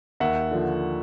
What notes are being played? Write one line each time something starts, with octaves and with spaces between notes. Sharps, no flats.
D#2 E5 F#5
D3 F3